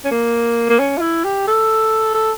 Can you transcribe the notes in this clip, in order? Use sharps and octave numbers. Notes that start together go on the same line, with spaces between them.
C#4
A#3
A#3
C#4
F4
E4
G4
A4
A4